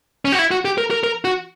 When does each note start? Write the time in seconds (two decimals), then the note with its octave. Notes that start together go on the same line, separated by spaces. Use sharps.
0.25 C#4
0.32 F#4
0.39 E4
0.51 F#4
0.65 G4
0.78 A#4
0.91 A#4
1.04 A#4
1.25 F#4